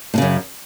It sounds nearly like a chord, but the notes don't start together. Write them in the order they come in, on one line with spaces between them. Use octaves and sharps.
A2 C#3 F#2